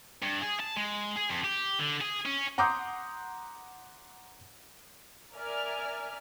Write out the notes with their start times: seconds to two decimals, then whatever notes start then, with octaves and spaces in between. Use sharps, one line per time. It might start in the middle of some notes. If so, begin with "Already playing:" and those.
0.22 G2
0.41 G#4
0.60 A5
0.76 G#3
1.16 G#4
1.30 F2
1.44 G4
1.79 D3
2.01 G#4
2.26 C#4
2.58 F#5 A#5 C6 D6 D#6 G6
5.34 A#4 D5 E5 G#5 F6